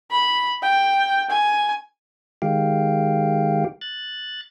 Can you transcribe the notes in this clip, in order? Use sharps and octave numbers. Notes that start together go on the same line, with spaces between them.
B5
G5
G#5
D#3 G#3 G4 F5 G5
F#6 A6